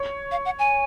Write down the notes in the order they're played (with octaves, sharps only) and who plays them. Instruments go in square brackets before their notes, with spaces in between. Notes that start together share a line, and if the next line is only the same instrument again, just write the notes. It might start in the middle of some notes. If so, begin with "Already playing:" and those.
Already playing: [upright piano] C#5
[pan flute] F5
F#5
G#5